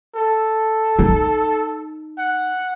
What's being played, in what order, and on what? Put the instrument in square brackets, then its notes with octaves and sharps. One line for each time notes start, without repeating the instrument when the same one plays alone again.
[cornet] A4
[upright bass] D#4
[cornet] F#5